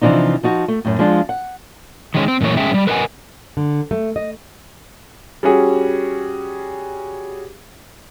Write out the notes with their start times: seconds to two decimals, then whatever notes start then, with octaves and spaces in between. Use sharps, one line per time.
0.01 C3 E3 F3 D4 D#4
0.43 F3 D#4 F#4
0.68 A3
0.85 F#2 A2
0.99 F3 G#3 D4 F4
1.29 F#5
2.14 D#3 G#3 C#4
2.28 C4
2.41 F#2 A#2 E3 A3 C#5
2.57 G#3 C#4 G#4 E5 G5
2.71 F3 G3
2.87 A#4 B4 D#5 E5 F#5 G#5
3.57 D3
3.91 A3
4.16 D#5
5.43 G3 C#4 F#4 G#4